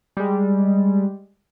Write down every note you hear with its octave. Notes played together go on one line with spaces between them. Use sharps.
G3 G#3